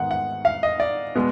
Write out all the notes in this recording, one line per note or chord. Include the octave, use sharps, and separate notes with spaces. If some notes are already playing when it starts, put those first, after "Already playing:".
Already playing: G#2 D#3 G#3 B3 F#5
F#5
F5
D#5
D5
B2 G#3 B3